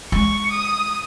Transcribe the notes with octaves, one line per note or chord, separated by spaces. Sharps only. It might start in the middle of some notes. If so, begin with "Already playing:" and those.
G#3 C#6
D#6